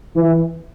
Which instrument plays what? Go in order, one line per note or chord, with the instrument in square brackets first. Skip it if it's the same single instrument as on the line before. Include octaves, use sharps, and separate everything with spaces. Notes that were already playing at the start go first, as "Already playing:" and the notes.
[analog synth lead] E3